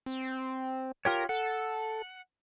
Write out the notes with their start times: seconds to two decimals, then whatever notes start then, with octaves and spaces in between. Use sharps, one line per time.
0.06 C4
1.05 F4 G4 A#4 C#5
1.29 A4 F#5